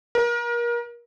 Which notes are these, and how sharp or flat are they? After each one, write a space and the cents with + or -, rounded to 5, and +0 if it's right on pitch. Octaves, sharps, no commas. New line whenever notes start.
A#4 +30